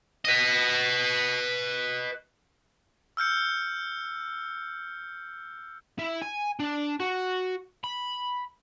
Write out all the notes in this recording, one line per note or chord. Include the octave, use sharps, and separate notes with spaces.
B4 D#5
E6 F6 G6 C#7
E4
G#5
D4
F#4
B5